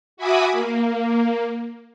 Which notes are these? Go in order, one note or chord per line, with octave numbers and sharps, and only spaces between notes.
F#4 E5 G#5 B5 D6 D#6
A#3